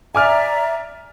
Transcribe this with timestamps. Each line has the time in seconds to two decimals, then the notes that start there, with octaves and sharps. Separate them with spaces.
0.15 D5 E5 G#5 A#5 D6 F6